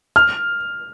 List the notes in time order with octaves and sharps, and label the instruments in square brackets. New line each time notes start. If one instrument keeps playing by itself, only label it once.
[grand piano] F6